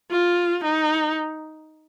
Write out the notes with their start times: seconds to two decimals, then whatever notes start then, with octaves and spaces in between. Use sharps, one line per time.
0.11 F4
0.64 D#4